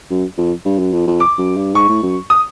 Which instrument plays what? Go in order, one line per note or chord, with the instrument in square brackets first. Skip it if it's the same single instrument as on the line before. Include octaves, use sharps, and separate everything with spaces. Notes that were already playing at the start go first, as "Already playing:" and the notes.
[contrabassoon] F#2
F2
G2
F#2
F2
F2
[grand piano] D6
[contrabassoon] F#2
G2
[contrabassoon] G#2 [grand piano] C#6
[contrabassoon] A2
F#2
[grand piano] D#6